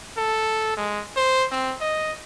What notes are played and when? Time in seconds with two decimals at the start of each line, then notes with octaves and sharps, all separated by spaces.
0.17 A4
0.77 G#3
1.16 C5
1.52 C4
1.80 D#5